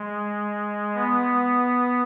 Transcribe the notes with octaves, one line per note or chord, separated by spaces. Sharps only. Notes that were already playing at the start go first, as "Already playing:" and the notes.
Already playing: G#3
B3